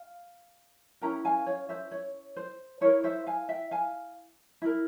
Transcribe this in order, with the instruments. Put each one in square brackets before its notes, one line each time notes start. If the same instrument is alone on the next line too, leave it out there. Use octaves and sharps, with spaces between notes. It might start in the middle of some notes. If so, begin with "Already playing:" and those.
Already playing: [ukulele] F5
C#4 E4 A#4 G5 A#5
F5 G#5
C#5 F5
C5 E5
C#5
C5
E4 A#4 C#5
C5 E5
F5 G#5
E5 G5
F5 G#5
E4 A#4